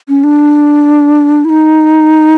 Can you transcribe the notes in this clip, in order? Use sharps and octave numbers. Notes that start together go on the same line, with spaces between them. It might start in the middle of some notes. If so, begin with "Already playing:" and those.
C#4
D4
E4
D#4